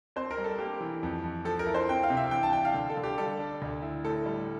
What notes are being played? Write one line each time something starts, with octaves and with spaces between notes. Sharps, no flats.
C4 C5
A#4
G3
A4
A#3 G4
E3
F2
F2
F3 A4
A#4
E4
C5
C4 G5
F5
C3
E5
E3 G5
A5
D4 G5
F5
D3
A4
D3
G4
G3 A4
D4
D2
E4
A2 A4
G3